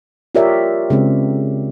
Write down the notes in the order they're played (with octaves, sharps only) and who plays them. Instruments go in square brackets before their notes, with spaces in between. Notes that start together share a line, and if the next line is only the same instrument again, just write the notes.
[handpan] F4 G4 A#4 C#5 D5 E5
C#3 G#3 C4